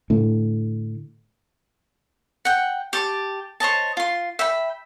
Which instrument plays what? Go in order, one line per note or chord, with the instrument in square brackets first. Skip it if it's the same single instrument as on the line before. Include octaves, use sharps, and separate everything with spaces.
[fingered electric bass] A2 D3
[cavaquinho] F#5 G5
G4 A5 C6 D6
C5 C#5 D#5 A5
F4 C6
E5 G5 B5